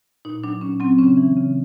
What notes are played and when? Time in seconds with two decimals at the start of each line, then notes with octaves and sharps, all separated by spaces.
0.25 A#2 D#4
0.44 F#3 D4
0.61 A#2 C#4
0.80 F#3 C4
0.99 C#3 C#4
1.17 E3
1.37 C#3